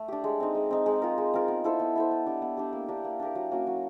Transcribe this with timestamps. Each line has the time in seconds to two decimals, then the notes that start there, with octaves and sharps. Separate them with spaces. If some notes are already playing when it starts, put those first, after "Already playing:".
Already playing: A3
0.08 D4 G4
0.24 G#3
0.40 C4 D#4
0.55 G#3
0.71 C4 D#4
0.86 G#3
1.02 C4 F4 A#4
1.18 G#3
1.34 C4 F4 A#4
1.48 B3
1.64 E4 A4 C5
1.80 B3
1.96 E4 A4 C5
2.11 B3
2.26 D4 G4
2.42 B3
2.57 D4 G4
2.73 A#3
2.88 D4 G4 A#4
3.04 A#3
3.19 D4 G4 A#4
3.35 F#3
3.51 A#3 C#4 F#4
3.67 F#3